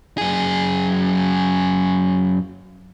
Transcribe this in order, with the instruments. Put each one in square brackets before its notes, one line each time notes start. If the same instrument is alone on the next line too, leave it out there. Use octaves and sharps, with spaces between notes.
[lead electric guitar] F#2 G#4